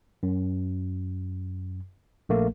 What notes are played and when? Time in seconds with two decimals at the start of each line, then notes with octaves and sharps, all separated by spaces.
0.23 F#2
2.29 A#1 A3 A#3